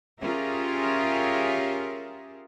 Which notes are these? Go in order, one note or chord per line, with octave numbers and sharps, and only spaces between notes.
C#4 F4 G4 G#4 A#4 E5